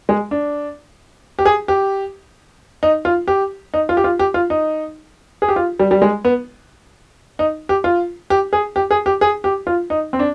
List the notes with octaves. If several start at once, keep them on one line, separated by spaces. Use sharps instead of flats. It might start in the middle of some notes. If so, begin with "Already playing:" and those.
G#3
D4
G4
G#4
G4
D#4
F4
G4
D#4
F4
G4
F4
G4
F4
D#4
G#4
G4
F4
G3
G3
G#3
B3
D#4
G4
F4
G4
G#4
G4
G#4
G4
G#4
G4
F4
D#4
C4
D4